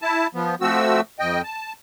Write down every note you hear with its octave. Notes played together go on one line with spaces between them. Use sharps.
E4 A5
F3 B3
F3 A3 C4 F#4 E6
F2 D#5 G5
A5